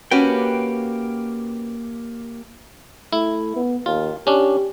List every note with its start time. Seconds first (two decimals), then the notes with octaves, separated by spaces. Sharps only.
0.11 A#3 C#4 F#4 G4 B4 G5
3.13 A3 E4
3.56 B3
3.86 D#2 F4
4.27 C#4 D4 G4